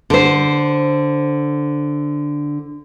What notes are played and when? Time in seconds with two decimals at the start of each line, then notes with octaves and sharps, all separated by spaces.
0.10 D3 C5